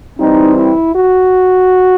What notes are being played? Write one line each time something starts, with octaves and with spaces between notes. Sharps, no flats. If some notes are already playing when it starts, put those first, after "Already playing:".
E3 G3 C4 D#4
E4
F#4